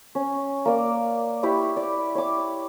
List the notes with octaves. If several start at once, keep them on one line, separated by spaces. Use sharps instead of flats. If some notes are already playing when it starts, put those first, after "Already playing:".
C#4
A#3 D5
E4 G4 B5 C#6
D5
C#5 D6